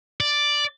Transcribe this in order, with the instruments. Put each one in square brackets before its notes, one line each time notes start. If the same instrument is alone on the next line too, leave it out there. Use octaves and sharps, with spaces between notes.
[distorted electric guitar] D5